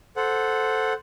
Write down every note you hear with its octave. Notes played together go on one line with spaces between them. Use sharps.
A4 C5 F#5